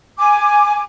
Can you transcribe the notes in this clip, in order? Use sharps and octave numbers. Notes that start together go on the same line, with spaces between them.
G#5 D6